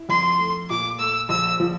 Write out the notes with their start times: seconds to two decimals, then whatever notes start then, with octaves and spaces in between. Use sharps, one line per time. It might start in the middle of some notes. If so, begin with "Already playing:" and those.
Already playing: E4
0.09 F2 C6
0.39 A3
0.70 A#2 D6
0.99 A3 E6
1.29 A#1 E6
1.60 F3